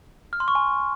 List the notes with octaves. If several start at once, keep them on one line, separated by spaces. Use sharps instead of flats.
F6
C6
C#6
G#5